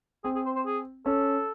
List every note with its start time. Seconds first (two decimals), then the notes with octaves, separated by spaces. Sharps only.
0.24 C4 G#4
0.35 G#4
0.46 C5
0.56 C5
0.66 G#4
1.06 C#4 A4